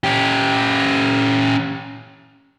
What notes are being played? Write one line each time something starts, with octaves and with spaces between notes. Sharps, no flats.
C#4 G4